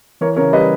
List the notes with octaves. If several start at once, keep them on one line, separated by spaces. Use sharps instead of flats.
E3 A#4 C#5
C#3 A#4 C#5
G3 B4 D#5